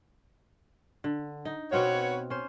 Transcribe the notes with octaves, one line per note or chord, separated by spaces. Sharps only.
D3
D#4
B2 C4 F#4 B4 C#5 F5
C#4 C5